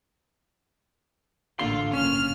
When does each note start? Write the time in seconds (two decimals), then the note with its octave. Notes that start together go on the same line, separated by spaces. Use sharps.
1.59 A1 D3 A#3 F4 C6
1.93 F#1 A#3 C#4 F6